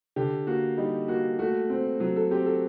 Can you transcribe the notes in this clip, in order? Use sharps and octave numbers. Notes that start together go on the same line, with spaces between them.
D3 G4
A#3 F#4
G3 D#4
A#3 F#4
A3 F#4
C4
F#3
A4
C4 G4
A4